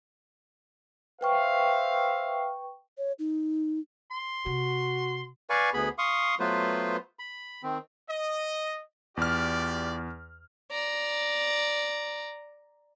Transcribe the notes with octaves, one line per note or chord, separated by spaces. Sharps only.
B4 C5 E5 F5 G5 C#6
C#5
D#4
C6
C3 F#4
B4 D5 F5 G#5 C#6
D2 B3 G#4 B5
F5 C6 C#6 D#6
F#3 A3 B3 F4 B4 C5
B5
D#3 C4
D#5
E2 F4 G4 D5 F6
D5 A#5